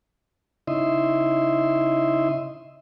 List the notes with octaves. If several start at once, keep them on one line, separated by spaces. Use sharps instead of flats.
C#3 D#4 E4 D#5 E5 C6